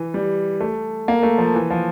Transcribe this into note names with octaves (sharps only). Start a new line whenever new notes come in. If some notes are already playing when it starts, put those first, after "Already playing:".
Already playing: E3
G3
A3
A#3
A3
F3
E3
F3